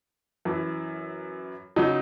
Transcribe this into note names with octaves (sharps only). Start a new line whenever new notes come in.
F#2 E3
C#3 F#3 D#4